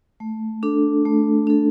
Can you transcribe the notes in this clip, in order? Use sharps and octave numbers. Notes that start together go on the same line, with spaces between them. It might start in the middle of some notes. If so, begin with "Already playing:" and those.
A3
D4 A4
A3
D4 A4